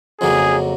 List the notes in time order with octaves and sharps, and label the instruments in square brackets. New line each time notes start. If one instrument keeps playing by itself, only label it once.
[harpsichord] F2 C#3 F#3 A#3 [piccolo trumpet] G#4